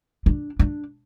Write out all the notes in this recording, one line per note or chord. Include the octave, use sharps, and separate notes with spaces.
D4
D4